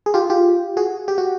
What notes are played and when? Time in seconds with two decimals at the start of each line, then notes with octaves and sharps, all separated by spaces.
0.06 G#4
0.14 F4 G4
0.30 F4 G4
0.77 F#4 G#4
1.08 G4
1.18 F#4